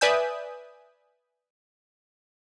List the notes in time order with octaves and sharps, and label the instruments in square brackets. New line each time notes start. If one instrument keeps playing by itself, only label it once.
[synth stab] B4 D5 E5 G#5 D#6 G6